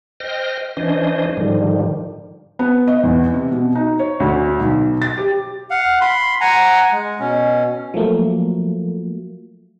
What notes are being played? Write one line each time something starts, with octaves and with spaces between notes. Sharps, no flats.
C5 D#5 G5 F6 A#6
E3 C#4 D4 C5 D#5
G#2 D3 D#3 F3 G3
B3
D#5
E2
C3
B2
D#4
C#5
D2
B1
A6
G4
F5 F#5
B5 C6
F#5 G#5 A#5
G#3
B2 C#4
F3 F#3 A3 A#3